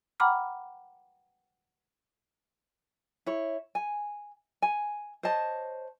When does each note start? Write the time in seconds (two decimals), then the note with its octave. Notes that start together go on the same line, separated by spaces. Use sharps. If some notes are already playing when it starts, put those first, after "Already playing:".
0.20 F#5 G5 A#5 B5 D6 F6
3.26 E4 C#5
3.75 G#5
4.62 G#5
5.23 C5 C#5 D#5 A5